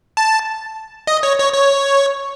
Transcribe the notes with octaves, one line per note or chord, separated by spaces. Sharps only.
A5
D#5
C#5
C#5
C#5